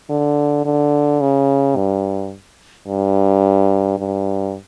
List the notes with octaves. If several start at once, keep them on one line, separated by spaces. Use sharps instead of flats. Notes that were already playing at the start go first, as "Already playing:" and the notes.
D3
D3
C#3
G2
G2
G2